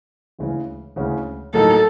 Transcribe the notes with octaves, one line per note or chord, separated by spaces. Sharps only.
D2 C#3 E3 G#3 C#4
D2 C#3 E3 G#3 C#4
A2 F#3 A#3 D#4 A4